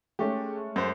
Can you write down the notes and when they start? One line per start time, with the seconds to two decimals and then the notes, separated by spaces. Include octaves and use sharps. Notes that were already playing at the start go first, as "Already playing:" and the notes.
0.19 G#3 A3 C#4 G4
0.76 F#2 C5